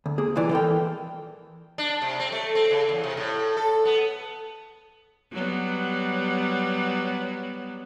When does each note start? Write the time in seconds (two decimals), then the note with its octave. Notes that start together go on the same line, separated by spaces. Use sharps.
0.06 D2
0.18 A#3 G#4
0.36 C2 A#2 E3 D5
0.51 E3 A4 A#4 G5
1.78 D4
2.02 C3
2.20 C4
2.32 A3
2.55 C4
2.71 C#3
2.89 E2
3.04 C3
3.17 A2
3.57 A4
3.85 B3
5.32 F#3 G3 B3